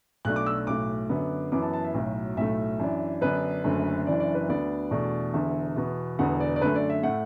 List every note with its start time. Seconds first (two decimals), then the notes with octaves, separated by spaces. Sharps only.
0.25 B1 B2 A3 D4 F#6
0.36 D6
0.46 E6
0.67 B1 A2 A3 D6
1.09 F#2 D3 B3
1.52 F#2 E3 B3 D6
1.62 A5
1.73 A5
1.84 E5
1.94 B1 A2 F#3
2.37 B1 A2 A3 E5
2.80 F#2 E3 D4
3.21 F#2 D3 B3 D4 B4
3.64 F#1 F#2 D3 A3
4.06 F#1 F#2 E3 D4 D5
4.20 D5
4.35 B4
4.49 D2 D3 B3 D4 D5
4.91 E2 B2 A3 D4
5.34 E1 E2 D3 E5
5.76 E2 B2 B3
6.19 E1 E2 D3 B3 F#5
6.40 D5
6.56 D5
6.61 F#2 D3 A3 B4
6.75 D5
6.90 E5
7.03 A2 A3 F#5